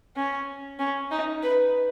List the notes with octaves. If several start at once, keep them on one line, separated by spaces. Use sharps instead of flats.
C#4
C#4
D#4
B4